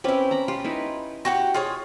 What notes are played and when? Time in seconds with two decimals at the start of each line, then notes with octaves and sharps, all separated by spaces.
0.04 C4 C#4 E4 G4 B4
0.31 A#5 B5
0.48 F4 G4
0.65 D#4 E4 B4
1.25 F#4 G4 F#5
1.54 F4 G#4 C#5